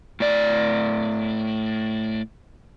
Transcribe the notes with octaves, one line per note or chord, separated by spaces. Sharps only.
A2 D5